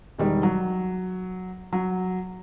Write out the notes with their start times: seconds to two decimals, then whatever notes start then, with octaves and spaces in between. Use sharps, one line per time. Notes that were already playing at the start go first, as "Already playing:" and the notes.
0.18 E1 D#3 G3
0.43 F#3
1.73 F#3